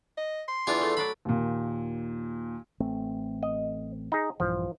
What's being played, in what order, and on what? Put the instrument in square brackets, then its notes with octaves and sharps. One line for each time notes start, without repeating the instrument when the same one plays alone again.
[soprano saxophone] D#5
C6
[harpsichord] E2 F4 G#5 [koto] D4
[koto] A3
[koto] F#3 D4 D5 [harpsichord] B5
[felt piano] D#2 A#2
[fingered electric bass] A1 A3 C4
[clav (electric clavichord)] D#5
D#4 G#4
[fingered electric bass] A#1 G2 E3 [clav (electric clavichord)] F3